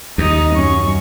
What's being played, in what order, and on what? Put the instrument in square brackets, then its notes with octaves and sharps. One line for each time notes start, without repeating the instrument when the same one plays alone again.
[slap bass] D#2 [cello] D#4 [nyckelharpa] D#5
[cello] F#2 [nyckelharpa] C#4 C#6